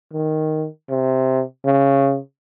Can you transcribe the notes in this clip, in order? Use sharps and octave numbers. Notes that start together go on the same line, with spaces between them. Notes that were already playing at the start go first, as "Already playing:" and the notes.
D#3
C3
C#3